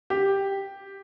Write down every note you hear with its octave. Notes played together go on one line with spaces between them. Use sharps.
G4